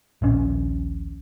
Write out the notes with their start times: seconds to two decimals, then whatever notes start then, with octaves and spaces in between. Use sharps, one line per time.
0.22 D#1 A#1 C#4